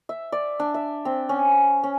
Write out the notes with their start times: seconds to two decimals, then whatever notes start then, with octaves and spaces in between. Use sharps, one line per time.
0.09 E5
0.32 D5
0.60 D4
0.74 E5
1.05 C4
1.29 C#4
1.83 C#4